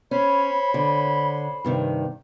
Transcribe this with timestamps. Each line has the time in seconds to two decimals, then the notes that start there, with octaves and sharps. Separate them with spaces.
0.11 C#4 C5 C#5 B5
0.74 D3
1.64 G2 C3 D#3